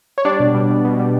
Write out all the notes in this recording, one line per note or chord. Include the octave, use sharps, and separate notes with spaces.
C#5
G3 D4 D5
B2
G3
B2
B2
G3